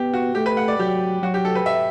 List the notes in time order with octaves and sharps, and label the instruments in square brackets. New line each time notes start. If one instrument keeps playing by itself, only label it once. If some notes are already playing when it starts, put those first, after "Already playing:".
Already playing: [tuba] B3 [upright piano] G4
[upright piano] F#4
[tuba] A3 [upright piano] G4
[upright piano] B4
F#5
D5
[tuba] F#3 [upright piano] G4
[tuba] F#3 [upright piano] F#4
[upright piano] G4
A4
B4
E5